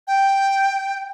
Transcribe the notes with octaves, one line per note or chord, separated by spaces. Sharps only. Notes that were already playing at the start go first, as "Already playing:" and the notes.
G5